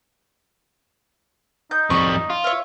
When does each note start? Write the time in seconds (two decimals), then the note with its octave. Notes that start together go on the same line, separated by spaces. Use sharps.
1.71 D#4 G6
1.90 F2 G3 C#6
2.30 F4
2.44 C#5 E5 F5